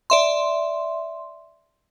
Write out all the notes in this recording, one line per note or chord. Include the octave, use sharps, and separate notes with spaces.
D5 E5 C6